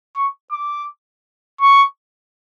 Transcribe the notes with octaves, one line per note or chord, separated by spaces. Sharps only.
C#6
D6
C#6